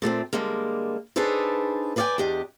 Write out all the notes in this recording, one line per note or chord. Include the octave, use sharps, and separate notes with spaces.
A#2 A3 A#3 C4
D3 G3 G#3 A#3
D4 D#4 G#4 A4 B4 C5
B4 C5 D5 F5 G5 G#5
E2 D4 G4 D#5